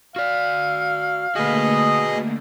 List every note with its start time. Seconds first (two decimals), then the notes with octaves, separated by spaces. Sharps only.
0.16 F#4 D5 F5
1.35 D3 A3 A#3 F#4 G#4 B4 D#5